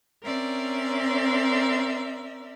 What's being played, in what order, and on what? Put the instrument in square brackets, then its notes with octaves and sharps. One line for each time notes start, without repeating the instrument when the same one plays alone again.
[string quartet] C4 C#4 A#4 D5 E5